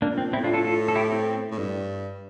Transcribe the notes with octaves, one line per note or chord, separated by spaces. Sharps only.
A#2 A#3 D4
C4
A2 C4 E4
D4 F4
F4 A4
F4 A4
A4
E4 G4
C4
A2
G2